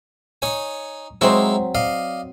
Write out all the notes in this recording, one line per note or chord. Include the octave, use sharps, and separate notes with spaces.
D#4 C#5 G#5
F#3 G#3 C4 D#4 E4 C5
D5 D#5 F5